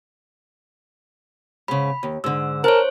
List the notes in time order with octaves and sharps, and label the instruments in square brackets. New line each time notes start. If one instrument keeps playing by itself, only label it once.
[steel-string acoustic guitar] G#2 C#3 [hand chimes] B5
[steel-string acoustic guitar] D#2
[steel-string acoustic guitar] G#2 D3 [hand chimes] E6
[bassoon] A#4 [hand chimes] C5 C#5 [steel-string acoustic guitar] A5